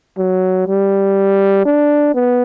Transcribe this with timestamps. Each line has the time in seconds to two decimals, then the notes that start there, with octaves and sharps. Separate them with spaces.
0.18 F#3
0.67 G3
1.65 D4
2.15 B3